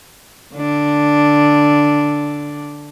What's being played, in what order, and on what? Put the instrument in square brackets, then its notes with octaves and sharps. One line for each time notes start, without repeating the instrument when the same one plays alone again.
[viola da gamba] D3 D4